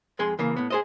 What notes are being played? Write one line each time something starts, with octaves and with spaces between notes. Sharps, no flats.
F2 G#3 G#4 G#5 C6
C#3 E3 A#3
A2 B3
G#4 C5 D#5